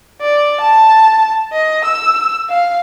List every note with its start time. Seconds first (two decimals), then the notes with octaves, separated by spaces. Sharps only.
0.21 D5
0.61 A5
1.52 D#5
1.85 E6
2.49 F5